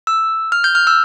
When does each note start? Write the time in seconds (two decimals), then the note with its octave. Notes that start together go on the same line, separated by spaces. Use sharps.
0.07 E6
0.52 F6
0.64 G6
0.75 F6
0.87 E6